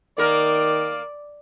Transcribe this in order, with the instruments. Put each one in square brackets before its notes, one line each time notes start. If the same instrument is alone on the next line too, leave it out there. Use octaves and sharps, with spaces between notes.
[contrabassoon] D#3 [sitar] A#3 A#4 [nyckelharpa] D5